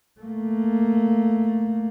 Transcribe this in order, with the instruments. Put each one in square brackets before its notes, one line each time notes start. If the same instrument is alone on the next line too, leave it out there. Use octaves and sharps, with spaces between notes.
[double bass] A3 A#3